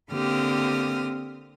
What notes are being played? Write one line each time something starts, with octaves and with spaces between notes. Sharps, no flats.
D3 A#3 C4 G4 D#6 F6